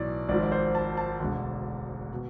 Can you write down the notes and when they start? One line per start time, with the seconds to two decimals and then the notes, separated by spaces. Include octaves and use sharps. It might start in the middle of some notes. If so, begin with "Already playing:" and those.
Already playing: B1 A2 E3 D5
0.29 G#1 G#2 F3 D5
0.43 D5
0.52 C5
0.75 A5
0.97 A5
1.20 E1 D2 D3
2.13 B2